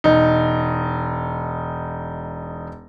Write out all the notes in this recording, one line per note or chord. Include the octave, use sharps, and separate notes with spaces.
E1 D#4